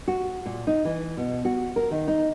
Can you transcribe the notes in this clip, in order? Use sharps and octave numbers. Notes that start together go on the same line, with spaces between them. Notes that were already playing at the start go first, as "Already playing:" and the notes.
F#4
A#2
D#4
E3
B2
F#4
A#4
D#3
D#4